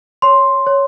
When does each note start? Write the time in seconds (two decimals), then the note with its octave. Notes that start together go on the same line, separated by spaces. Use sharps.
0.22 C#5 C6
0.67 C#5